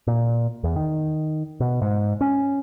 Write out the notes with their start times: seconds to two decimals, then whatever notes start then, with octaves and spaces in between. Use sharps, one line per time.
0.07 A#2
0.64 E2
0.76 D#3
1.60 B2
1.82 G#2
2.21 C#4